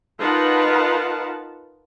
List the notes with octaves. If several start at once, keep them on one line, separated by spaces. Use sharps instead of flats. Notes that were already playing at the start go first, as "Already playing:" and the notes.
D#4 F4 A#4 B4 F#5 A5